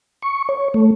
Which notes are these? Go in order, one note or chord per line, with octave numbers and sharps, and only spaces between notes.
C#6
C#5
A3